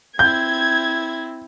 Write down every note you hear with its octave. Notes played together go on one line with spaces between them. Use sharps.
C4 E4 G6 G#6